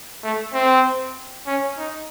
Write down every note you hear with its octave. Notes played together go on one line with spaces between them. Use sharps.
A3
C4
C#4
D#4